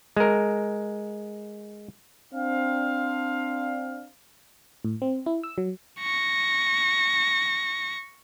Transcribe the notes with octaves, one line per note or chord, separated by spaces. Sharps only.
G#3 A#4
C4 D4 F5
A2
C4
E4
E6
F#3
C#6 A#6